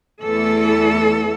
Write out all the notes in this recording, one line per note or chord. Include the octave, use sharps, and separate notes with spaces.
E2 E3 A3 A4